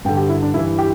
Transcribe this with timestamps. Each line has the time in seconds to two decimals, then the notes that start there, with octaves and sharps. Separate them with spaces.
0.05 G2 G5
0.09 D3
0.17 G4
0.29 E4
0.43 D4
0.54 G2 E3 E4
0.79 G4